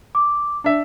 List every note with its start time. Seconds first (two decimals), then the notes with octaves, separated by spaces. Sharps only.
0.15 D6
0.64 D4 E5